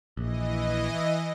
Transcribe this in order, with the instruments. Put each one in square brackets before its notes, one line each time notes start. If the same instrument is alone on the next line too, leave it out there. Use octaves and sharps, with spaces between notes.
[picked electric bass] A#1 [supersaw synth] E3 D#5